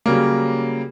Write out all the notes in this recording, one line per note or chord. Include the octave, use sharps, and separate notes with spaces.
C#3 F#3 G3 A#3